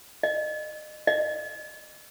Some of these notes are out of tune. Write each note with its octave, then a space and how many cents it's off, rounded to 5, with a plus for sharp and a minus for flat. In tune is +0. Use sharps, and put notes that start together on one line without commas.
D#5 -30
D#5 -35